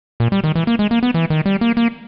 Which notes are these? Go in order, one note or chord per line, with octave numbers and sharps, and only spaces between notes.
A#2
G3
D#3
E3
A#3
G#3
A#3
B3
E3
D#3
G3
A#3
A#3